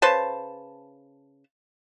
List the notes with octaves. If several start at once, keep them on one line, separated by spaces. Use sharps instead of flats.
C#3 B4 C5 A5